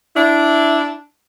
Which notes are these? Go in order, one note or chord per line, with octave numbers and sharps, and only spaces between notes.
D4 E4